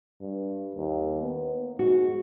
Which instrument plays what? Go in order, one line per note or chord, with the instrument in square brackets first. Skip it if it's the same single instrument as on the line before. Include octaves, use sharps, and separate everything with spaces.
[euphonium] G2
D#2
B3
[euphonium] G#2 [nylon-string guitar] F#4